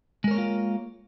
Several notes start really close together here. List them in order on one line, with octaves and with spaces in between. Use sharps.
G#3 A#4 C#5 A#3 F4